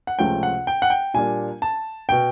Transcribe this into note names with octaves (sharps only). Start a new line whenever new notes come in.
F#5
C#2 C3 F3 A3 C#4 G5
F#5
G5
F#5
G5
A#2 G3 A#3 D4 G#5
A5
B2 G5